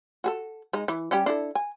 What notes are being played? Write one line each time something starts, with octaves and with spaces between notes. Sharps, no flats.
F#4 G#4 A4
G#3 D#4
E3
G3 C#4 G4
D4 E4 A4
G#5